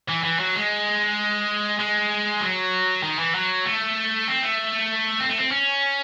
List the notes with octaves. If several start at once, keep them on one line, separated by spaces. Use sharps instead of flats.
E3
E3
F#3
G#3
G#3
F#3
D#3
E3
F#3
A3
C4
A3
C4
A3
C4
C#4